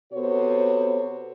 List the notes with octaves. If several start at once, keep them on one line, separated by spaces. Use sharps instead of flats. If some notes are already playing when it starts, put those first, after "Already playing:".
C3 B3 F#4 A4 C5 C#5